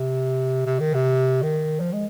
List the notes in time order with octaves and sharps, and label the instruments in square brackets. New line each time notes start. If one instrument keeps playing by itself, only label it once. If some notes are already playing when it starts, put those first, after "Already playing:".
Already playing: [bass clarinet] C3
C3
D#3
C3
D#3
F3
G#3